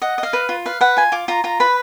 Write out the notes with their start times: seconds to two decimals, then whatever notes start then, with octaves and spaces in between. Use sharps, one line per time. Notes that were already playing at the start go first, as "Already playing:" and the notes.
0.02 D#5 F#5
0.18 D#5
0.23 F5
0.33 B4
0.49 F4
0.66 B4 F5
0.81 B4 F#5
0.97 F4 G#5
1.12 F4 D6
1.28 F4 A#5
1.44 F4 A#5
1.60 B4 B5